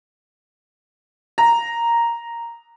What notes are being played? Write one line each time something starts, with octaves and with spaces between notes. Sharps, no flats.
A#5